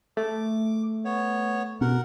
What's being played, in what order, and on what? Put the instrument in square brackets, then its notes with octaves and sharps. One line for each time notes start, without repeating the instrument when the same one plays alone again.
[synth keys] A3 [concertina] D6
[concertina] B3 C#5
[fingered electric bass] B2 [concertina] A#4 F#5